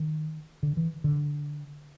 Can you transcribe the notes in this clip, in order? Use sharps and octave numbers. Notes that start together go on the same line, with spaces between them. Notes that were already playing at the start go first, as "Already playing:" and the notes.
Already playing: D#3
D3
E3
D3